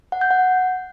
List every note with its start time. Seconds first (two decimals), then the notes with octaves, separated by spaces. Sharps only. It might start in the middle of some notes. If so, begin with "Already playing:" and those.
0.12 F#5
0.21 G6
0.31 F#5